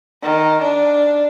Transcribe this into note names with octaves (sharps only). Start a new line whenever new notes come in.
D#3
D4